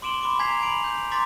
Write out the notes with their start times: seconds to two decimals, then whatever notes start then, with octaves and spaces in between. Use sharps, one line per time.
0.02 C6 D6 D7 E7 F#7 G7
0.22 B5 C6 D6 D7
0.39 G#5 A#5 G#6 B6 C7 F7
0.61 G#5 B5 D7 F7 F#7
0.84 G6
1.11 A#5 C6 D6 A6 B6